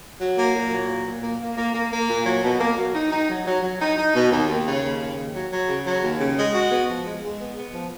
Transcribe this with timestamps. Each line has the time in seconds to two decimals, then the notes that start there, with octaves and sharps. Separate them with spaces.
0.20 F#3
0.38 A#3
0.55 A#2
0.72 F#3
0.89 A#2
1.06 A#2
1.23 A#3
1.40 A#3
1.57 A#3
1.74 A#3
1.92 A#3
2.09 A#2
2.26 F#3
2.43 B2
2.60 A#3
2.77 F#3
2.95 D#4
3.12 D#4
3.29 F#3
3.46 F#3
3.62 F#3
3.80 D#4
3.97 D#4
4.14 B2
4.31 D#2
4.48 D#2
4.65 C#3
4.83 D#2
5.00 C#3
5.17 D#2
5.34 F#3
5.51 F#3
5.69 C#3
5.85 F#3
6.02 D#2
6.19 C#3
6.37 G#3
6.54 F#4
6.71 B3
6.89 F3
7.06 G#3
7.22 G#3
7.40 B3
7.57 B3
7.73 F3